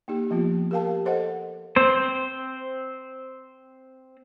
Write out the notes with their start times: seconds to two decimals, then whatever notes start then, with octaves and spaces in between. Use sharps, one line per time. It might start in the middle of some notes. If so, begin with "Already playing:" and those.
0.08 A#3 D#4 G4
0.31 F3 A#3 B3 F4
0.71 G4 A#4 F5 G5 A5
1.05 A4 C5 D#5 F#5
1.76 C4 C5